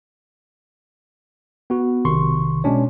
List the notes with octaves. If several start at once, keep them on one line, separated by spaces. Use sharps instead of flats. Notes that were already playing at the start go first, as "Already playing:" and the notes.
B3 F#4
B1 C3 D#3 C6 C#6
B2 G#3 C#4 D4 C#5